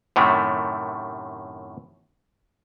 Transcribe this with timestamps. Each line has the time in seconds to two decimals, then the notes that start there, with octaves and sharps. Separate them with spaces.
0.16 F#2 A2 C3 D#3 A3